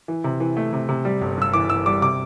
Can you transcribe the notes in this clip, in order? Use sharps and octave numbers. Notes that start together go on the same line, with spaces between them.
E3
C3
E3
A3
C3
C3
G3
G1
G2 E6
E3 D6
E3 E6
G3 D6
C3 D6